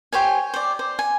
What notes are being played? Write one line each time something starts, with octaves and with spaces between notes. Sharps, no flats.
G4 C5 C#5 G#5
C5 D5
C5
G#5